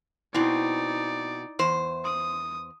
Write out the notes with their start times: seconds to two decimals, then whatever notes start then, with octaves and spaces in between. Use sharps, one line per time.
0.34 B2 C4 D#4 E4 D5
1.59 E2 C5 C6 C#6
2.05 C6 D#6